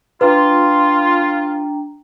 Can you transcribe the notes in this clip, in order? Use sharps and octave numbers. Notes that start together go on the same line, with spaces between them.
D4 F4 B4 G5 A#5